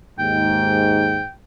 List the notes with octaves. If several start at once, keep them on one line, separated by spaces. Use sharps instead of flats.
D#2 G#2 G5